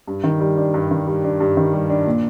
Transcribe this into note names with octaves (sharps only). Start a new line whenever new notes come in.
G2
D#3
G3
D4
G2
D#3
G3
D4
G2
D#3
G3
D4
A#2